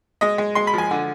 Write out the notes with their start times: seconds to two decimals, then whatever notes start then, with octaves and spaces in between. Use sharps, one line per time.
0.21 G#3 D#5
0.38 G#3
0.55 G#3 C6
0.67 B5
0.74 F3 G#5
0.91 D3